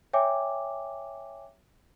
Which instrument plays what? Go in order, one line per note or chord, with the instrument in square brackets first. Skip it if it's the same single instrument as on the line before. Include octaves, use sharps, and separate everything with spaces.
[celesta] C#5 E5 G5 G#5 D6